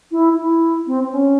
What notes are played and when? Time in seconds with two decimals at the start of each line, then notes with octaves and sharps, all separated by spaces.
0.12 E4
0.37 E4
0.87 C4
1.04 C4
1.12 C#4